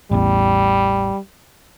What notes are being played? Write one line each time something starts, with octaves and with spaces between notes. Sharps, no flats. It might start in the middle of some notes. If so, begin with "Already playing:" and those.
A1 E2 G3